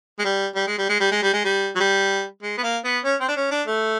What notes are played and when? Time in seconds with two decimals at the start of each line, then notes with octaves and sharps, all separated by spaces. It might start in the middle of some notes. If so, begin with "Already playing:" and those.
0.19 G#3
0.25 G3
0.55 G3
0.67 G#3
0.78 G3
0.89 G#3
1.00 G3
1.11 G#3
1.22 G3
1.33 G#3
1.44 G3
1.75 F#3
1.80 G3
2.42 G#3
2.58 B3
2.63 A#3
2.84 B3
3.04 C#4
3.20 C4
3.28 D4
3.36 C#4
3.51 D4
3.67 A3